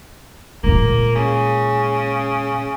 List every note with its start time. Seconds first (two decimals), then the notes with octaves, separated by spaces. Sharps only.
0.63 A#2 G#3 A#3
1.15 C#3